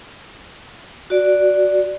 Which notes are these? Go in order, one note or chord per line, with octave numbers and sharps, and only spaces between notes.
F#4 D5